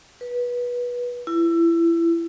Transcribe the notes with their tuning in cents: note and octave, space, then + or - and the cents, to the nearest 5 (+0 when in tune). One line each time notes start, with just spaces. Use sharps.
B4 -20
E4 +25